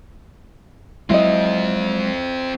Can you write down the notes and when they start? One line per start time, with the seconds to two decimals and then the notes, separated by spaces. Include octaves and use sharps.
1.10 F#3 G#3 C4 E4 F4 D#5